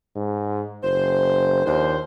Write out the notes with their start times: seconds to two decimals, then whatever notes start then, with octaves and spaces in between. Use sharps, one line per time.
0.16 G#2
0.84 F#1 C5
1.66 D#2 F3 D4 C5